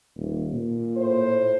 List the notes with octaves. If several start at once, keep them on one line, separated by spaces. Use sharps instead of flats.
D#1
A#2
A2 C5